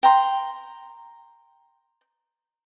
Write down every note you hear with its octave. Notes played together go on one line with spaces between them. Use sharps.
G5 A#5 C6